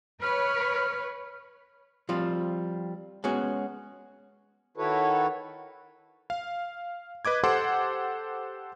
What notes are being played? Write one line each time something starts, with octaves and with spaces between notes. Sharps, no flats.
B4 C#5 F6
F3 G3 C4 F4
G#3 B3 C#4 F#4
D#3 E4 F#4 A4 B4 C#5
F5
B4 D#5 D6 G#6
G4 A4 C5 F#5 C6 D6